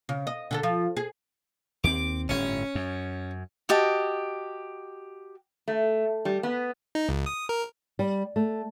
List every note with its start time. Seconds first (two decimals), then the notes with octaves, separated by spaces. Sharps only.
0.09 C#3
0.27 D#5
0.51 D3 G3 A4
0.63 F3
0.97 G#4
1.84 D#2 C4 D6
2.29 G1 A2 C#4
2.75 F#2
3.69 F#4 G4 D#5 A5
5.68 A3
6.25 G3
6.43 B3
6.95 D#4
7.09 C#2
7.26 D#6
7.49 A#4
7.99 G3
8.36 A3